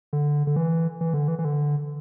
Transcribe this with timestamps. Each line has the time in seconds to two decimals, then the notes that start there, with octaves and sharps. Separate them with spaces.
0.13 D3
0.47 D3
0.56 E3
1.01 E3
1.14 D3
1.28 E3
1.39 E3
1.45 D3